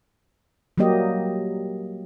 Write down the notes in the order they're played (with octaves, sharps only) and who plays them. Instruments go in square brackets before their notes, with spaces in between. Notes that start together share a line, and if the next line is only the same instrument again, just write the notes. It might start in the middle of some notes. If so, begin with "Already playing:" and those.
[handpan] F#3 G3 A#3 G4 D#5